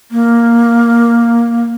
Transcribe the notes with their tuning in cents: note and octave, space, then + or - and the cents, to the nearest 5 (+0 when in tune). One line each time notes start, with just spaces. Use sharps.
A#3 +5